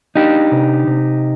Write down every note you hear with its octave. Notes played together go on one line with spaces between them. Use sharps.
D4 D#4 G4
C3
C3